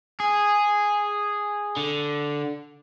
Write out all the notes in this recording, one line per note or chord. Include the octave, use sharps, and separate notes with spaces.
G#4
D3